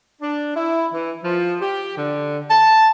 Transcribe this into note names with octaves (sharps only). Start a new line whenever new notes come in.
D4
E4
E3
F3
G4
D3
A5